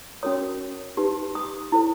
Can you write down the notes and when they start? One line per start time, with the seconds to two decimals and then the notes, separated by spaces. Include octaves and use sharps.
0.23 C#4 F#4 A#4 C#5 D#6
0.97 D#4 G4 B4
1.35 D#6
1.72 E4 A4 C5